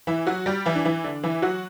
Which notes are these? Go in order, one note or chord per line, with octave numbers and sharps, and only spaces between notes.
E3 E4
F#3 F#4
G3 G4
E3 E4
D4
E3 E4
D3 D4
E3 E4
F#3 F#4